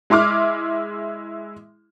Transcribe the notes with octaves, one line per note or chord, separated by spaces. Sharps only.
G#3 E4 C6 D6 F6